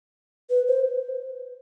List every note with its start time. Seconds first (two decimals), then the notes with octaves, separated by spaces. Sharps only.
0.50 B4
0.68 C5